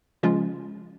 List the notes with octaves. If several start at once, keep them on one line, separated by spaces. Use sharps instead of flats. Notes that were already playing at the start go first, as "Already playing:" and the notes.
C#3 F3 G#3 C#4 F4